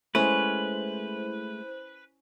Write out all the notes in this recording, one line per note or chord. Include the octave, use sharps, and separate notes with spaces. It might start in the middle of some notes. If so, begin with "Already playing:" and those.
G#3 A3 C#4 E4 B4 C5